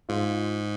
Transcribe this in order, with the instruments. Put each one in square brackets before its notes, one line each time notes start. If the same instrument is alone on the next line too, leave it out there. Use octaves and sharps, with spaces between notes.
[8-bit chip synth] G#2 [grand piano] F4